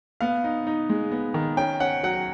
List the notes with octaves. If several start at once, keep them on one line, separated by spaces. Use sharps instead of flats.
B3 F5
D#4
D#4
G#3
B3
D#3
C#4 G5
C#4 F#5
F#3 F#5